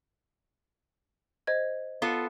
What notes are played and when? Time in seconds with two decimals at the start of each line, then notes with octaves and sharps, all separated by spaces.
1.47 C5 D#5 G#6
2.02 B3 F4 A4